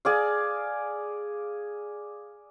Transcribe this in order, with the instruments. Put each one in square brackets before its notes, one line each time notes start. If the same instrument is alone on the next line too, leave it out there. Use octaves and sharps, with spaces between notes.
[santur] G#4 D5 F5